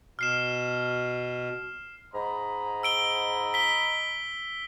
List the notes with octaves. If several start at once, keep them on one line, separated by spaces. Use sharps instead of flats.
B2 F6 C7 E7
G#2 D#5 A#5 B5
E6 D7 G7
B6 G7